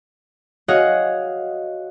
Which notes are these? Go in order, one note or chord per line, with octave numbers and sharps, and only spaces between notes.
F#4 G#4 C#5 D#5 F5 F#5